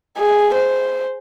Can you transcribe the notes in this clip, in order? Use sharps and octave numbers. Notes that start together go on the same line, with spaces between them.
G#4
C5